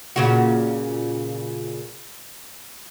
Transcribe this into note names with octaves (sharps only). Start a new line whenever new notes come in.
A#2 C#3 F#4